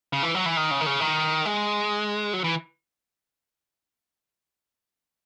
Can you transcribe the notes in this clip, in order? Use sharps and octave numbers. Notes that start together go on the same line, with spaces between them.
C#3
E3
F#3
E3
D#3
C#3
D#3
C#3
D#3
G#3
F#3
E3